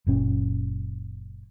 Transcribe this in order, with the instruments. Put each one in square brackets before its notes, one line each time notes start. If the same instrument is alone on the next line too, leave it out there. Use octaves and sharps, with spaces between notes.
[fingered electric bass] F#1 A#2 C#4